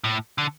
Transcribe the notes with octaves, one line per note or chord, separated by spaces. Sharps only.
A2
D3